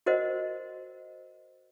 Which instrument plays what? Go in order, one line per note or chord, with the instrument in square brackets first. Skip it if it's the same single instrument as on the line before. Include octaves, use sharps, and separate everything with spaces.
[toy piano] F#4 A#4 C5 D#5 F#5